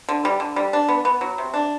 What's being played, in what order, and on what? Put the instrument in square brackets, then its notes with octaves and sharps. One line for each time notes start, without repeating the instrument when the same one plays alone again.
[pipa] D3
G3
D3
G3
D4
B3
B3
F#3
C3
D4